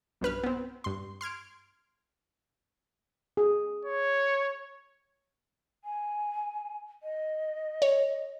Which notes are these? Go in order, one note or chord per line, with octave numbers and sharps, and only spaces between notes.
B1 G2 B4 F6
B3 C4
G2 C6
C6 F6 G#6 D7
G#4
C#5
G#5
D#5
C#5